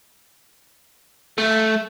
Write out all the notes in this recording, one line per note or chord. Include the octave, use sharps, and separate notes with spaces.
A3